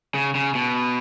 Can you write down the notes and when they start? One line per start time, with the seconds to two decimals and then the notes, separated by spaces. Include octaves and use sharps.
0.15 C#3
0.35 C#3
0.55 B2